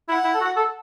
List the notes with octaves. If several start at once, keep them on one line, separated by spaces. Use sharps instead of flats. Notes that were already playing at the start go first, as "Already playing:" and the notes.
E4 F#5
E4
A4
F#4
A4